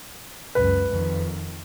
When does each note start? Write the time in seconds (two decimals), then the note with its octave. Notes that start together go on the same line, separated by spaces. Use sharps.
0.55 C#2 F#2 B4
0.89 F2 D#3